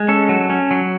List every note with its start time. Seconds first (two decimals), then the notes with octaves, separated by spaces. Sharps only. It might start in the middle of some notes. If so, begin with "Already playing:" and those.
Already playing: G#3
0.08 C#4 A4
0.29 F#3
0.50 C#4
0.71 F#3